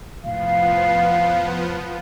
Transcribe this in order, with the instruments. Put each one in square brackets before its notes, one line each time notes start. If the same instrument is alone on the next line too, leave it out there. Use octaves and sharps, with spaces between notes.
[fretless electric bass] F1 A2 [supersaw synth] F3 B3 [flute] F5